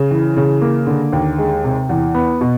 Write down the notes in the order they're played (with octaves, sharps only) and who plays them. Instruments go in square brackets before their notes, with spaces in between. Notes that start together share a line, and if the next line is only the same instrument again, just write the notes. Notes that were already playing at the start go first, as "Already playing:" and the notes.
Already playing: [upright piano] C#3
E3
C#3
A#3
D3
D#2
G#3
C3
E2
B3
B2